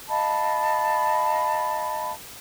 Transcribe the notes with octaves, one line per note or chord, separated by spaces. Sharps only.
D#5 F5 A5 B5